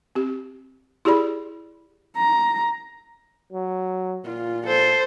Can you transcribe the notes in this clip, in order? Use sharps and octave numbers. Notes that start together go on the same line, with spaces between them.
C4 G4
E4 G4 G#4 D5 B5
A#5
F#3
A#2 F4
A4 C5